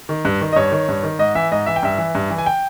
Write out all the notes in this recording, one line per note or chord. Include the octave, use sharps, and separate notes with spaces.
D#3
G2
D#3
D#5
G2 C#5
D#3
G2
D#3
G#2 D#5
E3 E5
G#2 D#5
E3 E5
G5
G2 E5
E3
G2
E3
G#5
G5